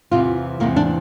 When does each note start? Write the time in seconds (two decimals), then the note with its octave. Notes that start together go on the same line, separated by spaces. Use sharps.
0.11 E2 C3 E3 F4
0.60 E2 C3 E3 A#3
0.76 D4